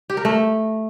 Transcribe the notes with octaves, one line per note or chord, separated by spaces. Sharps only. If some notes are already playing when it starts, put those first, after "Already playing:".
G4
A#4
A3